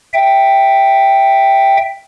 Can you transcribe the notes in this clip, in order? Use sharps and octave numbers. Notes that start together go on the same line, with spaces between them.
E5 G5